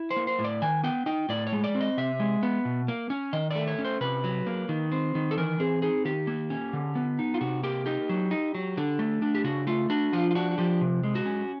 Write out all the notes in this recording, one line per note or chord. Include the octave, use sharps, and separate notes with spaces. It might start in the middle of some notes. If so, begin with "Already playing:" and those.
Already playing: E4
C5
A#3
C5
A2
D5
D#3 G#5
B3 G5
D#4 G5
A2 D5
C#5
G#3
D5
C4
D#5
C3 E5
G#3
B3
B2
A#3
C#4
D#3 D#5
A3 D5
C#5
C#4
C5
C3 B4
F#3
A#3
D#3
C4
D#3
A4
E3 A#4
C4 G#4
D#4 G#4
D#3 G4
A#3
C#4
D3
B3
D#4
F4
C3 F#4
A#3 G4
D#4 G4
F#3
D#4
F#3
D3
A3
D4
G4
C#3 F#4
A3 F4
D4 F#4
F3 F4
F4
D4 F#4
F#4
F3 G4
C3
G#3
F#4
C#4